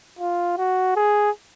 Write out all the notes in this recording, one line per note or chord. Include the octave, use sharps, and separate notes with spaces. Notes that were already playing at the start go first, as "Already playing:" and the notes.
F4
F#4
G#4